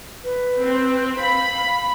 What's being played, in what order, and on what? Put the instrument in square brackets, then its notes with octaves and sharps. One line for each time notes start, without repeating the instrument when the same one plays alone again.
[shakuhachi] B4
[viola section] C4
[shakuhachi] F5 [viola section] B5